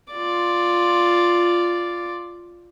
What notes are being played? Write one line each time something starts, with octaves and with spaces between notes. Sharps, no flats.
F4 D5